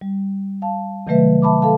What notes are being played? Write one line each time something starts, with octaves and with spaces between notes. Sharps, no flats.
G3
F5 A5
C3 D#3 F#3 A3 B4 E5
E5 A5 B5 D6
A4 F5 A5